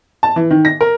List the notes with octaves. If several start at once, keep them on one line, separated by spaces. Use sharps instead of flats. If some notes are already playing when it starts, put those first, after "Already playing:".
A5
E3
D#3
A#6
A#4